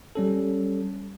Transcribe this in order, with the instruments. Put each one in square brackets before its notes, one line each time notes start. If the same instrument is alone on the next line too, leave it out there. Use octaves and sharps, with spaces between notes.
[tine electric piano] G3 C#4 A4